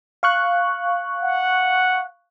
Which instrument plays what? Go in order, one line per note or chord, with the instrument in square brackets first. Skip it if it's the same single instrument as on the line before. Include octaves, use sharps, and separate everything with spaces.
[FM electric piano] F5 C#6 F#6
[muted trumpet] F#5